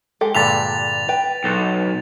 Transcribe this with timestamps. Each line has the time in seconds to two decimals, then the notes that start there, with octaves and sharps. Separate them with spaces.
0.21 G#3 G4 A4
0.35 G2 A#2 D3 A6 B6 F7
1.08 B4 G5
1.44 B1 F#4 A4 A5